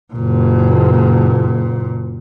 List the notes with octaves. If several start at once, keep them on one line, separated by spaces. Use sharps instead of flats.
F#1 A#2